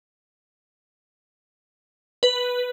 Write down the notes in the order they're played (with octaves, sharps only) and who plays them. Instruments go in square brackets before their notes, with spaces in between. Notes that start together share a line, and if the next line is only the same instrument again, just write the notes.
[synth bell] B4